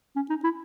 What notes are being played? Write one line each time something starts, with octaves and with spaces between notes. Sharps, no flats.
C#4
D#4
E4